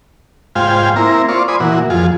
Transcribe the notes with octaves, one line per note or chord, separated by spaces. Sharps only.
G#2 F4 C5 F5 G5 G#5
A#3 C4 E4 A#5
F4 C5 D5 C#6
C5 D5 G#5 B5 D#6
A#2 E3 F#4
F2 F4 G#4